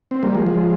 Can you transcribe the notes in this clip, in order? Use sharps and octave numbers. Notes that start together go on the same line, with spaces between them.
C4
G3 A#3
F3 G#3
F3 G#3